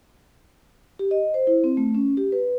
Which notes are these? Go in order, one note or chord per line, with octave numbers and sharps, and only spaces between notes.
G4
D#5
C5
E4
C4
A3
C#4
G4
B4